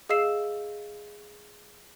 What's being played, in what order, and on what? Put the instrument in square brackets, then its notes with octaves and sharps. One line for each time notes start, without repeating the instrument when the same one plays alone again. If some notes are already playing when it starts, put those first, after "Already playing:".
[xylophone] G#4 D#5 F5 E6 C7 E7